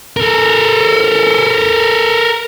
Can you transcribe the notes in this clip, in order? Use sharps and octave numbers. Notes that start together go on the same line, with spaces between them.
A4 A#4